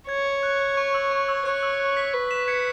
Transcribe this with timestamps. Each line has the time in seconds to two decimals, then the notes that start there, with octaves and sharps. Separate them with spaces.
0.08 C#5 G#6
0.43 F#6
0.77 C#6
0.94 E6
1.11 C#6
1.28 E6
1.45 C#5 F#6
1.63 E6
1.80 F#6
1.97 B6
2.14 B4
2.31 B6 E7
2.48 G#6 C#7